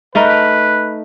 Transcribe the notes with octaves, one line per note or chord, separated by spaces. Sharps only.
A3 D#4 A#4 B4